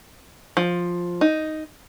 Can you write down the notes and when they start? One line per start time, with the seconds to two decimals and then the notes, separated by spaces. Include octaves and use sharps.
0.57 F3
1.21 D#4